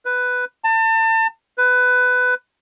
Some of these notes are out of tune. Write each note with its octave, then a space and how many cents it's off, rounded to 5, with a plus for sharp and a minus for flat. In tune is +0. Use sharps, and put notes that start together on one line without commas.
B4 +5
A5 +35
B4 +15